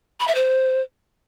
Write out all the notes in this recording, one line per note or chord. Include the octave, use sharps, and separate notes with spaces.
B5
E5
C5